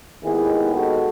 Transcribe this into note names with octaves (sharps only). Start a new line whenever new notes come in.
D#2 D#3 G#3 B3 E4 G#4
F#4 A4